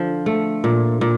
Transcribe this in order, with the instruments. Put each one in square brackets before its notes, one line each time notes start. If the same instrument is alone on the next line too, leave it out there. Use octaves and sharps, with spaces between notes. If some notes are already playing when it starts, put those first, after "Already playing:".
Already playing: [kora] D3 F3
A3
A#2
A#2